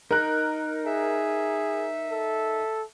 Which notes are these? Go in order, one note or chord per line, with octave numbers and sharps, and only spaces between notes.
D#4 A#4 F#6
G#4 E5
A4